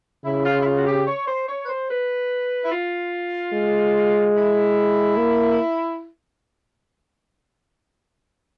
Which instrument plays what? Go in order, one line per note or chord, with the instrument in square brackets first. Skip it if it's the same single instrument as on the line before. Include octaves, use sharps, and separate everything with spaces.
[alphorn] C#3 [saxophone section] E4
[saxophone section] F4
E4
F4
F#4
G4
C#5
C5
C#5
B4
C5
B4
E4
F4
[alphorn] G#3
[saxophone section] E4
[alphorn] A#3